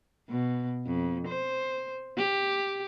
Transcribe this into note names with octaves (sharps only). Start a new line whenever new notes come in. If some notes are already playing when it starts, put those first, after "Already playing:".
B2
F2
C5
G4